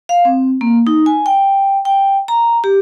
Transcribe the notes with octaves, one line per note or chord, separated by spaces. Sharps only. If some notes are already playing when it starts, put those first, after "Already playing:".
F5
C4
A#3
D#4
G#5
G5
G5
A#5
G4